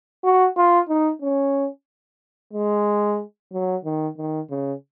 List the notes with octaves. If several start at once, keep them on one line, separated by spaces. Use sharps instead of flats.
F#4
F4
D#4
C#4
G#3
F#3
D#3
D#3
C#3